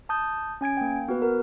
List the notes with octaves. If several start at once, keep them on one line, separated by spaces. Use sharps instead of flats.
A5 D#6 G6
C#4 G#5 G#6 D7
A#3 G5
B3 F#4 B4
A#4